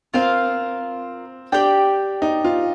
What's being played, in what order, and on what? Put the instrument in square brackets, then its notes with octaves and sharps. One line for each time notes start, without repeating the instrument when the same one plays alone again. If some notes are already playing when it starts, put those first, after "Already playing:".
[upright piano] C4 [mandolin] F4 A#4 F5
[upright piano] D4 [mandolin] G4 D5 G5
[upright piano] D#4
F4